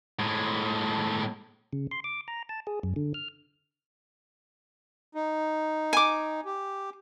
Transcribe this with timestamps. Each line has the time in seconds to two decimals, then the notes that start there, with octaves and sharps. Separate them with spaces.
0.19 A2 G#3
1.73 C#3
1.91 C6
2.04 D6
2.28 A#5
2.49 A5
2.67 G#4
2.83 F#2
2.96 D3
3.14 F6
5.15 D#4
5.93 G#5 D6
6.45 G4